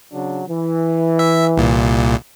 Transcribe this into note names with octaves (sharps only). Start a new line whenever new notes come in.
C#3 F#3 D4
E3
E5
C2 A#2